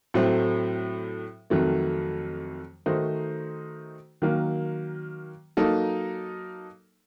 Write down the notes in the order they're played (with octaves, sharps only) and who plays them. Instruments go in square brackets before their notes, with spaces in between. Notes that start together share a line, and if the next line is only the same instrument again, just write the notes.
[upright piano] A2 F#3 A3 C4
F2 D#3 F#3 A3
D#3 A3 D#4 F#4 C5
D#3 F#3 A#3
F#3 A#3 D#4 A4